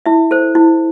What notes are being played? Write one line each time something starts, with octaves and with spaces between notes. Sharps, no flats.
E4 E5
A4 C5
E4